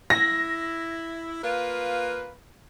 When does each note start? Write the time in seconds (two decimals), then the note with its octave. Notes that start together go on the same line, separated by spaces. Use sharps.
0.10 E4 A#6
1.42 A#3 F4 B4